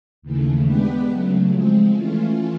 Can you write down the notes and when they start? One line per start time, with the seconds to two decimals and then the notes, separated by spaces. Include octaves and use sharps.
0.22 D#2 C#3 E3 A3
0.65 G#3 B3 D4 G4 B4
1.08 C#3 F#3 A3
1.51 F3 G#3 C4
1.94 E3 A3 C#4 F4